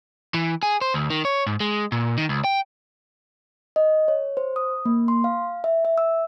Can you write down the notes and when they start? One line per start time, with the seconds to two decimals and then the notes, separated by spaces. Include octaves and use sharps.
0.34 E3
0.63 G#4
0.81 C5
0.94 D2
1.10 D#3
1.25 C#5
1.47 G#2
1.60 G#3
1.92 A#2
2.18 D#3
2.29 C#2
2.44 G5
3.76 D#5
4.08 C#5
4.37 C5
4.56 D#6
4.85 A#3
5.08 C6
5.24 F5
5.64 E5
5.85 E5
5.98 E6